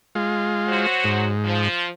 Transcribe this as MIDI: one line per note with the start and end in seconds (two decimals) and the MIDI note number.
0.15 0.86 56
0.15 0.86 65
0.68 1.29 54
0.68 1.29 66
0.68 1.29 72
1.05 1.68 44
1.44 1.87 53